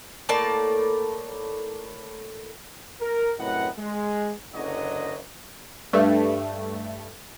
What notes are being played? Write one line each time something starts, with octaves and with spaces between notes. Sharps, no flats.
A2 A#3 D5 A5
A#4
F#2 A2 C3 B4 D#5 F#5
G#3
F#1 D3 F#3 D#5
G2 A3